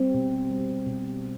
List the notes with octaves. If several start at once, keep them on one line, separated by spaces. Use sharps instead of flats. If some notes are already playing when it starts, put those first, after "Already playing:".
Already playing: G3 C4
B2
G3
B2